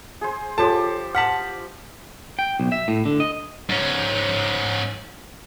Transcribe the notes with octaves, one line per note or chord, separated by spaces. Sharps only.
G#4 C5
F3 G4 A4 C5 C#5 A5
F#5 A5 F6 B6 F#7
G5
B1
E5
A2
D3
D#5
G#2 C#4